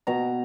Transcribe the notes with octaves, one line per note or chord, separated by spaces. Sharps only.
B2 A#5